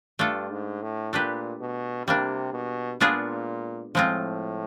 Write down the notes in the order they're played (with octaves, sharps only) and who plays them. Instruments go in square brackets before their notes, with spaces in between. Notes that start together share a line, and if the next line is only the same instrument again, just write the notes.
[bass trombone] G2 [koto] A3 D4 F4 A4
[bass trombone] G#2
A2
[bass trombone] A#2 [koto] A3 D4 G4 B4
[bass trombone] B2
[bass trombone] C3 [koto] G3 A#3 D4
[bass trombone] B2
[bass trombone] A#2 [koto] G#3 B3 D4 F4 G#4
[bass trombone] A2 [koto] F3 G#3 C4 F4